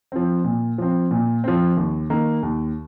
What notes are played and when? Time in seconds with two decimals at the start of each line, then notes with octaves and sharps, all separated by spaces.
0.12 F3 C4
0.44 A#2
0.78 F3 C4
1.11 A#2
1.44 F3 C4
1.77 D#2
2.10 D#3 A#3
2.43 D#2